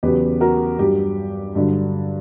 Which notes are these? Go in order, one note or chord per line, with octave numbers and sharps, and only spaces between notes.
E2 C#3 F#3 G4 B4
F#4 A#4
G2 F#3 G4
G2 D3 F#3